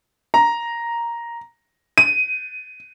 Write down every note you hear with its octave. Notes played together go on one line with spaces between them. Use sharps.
A#5
D#7